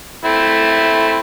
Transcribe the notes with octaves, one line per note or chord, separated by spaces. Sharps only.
A3 C4 E4